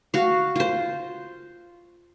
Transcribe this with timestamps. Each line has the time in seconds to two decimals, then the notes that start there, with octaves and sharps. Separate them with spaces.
0.14 F#4 F5
0.56 F4 C5